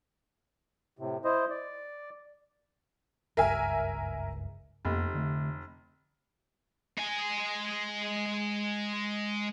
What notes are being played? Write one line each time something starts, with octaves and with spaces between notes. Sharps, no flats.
A2 C3
E4 C5 D#5
D5
F#1 C#2 G2 A#4 E5 G#5
F1 F2 A#3 B3
D3 A3
G#3 G#5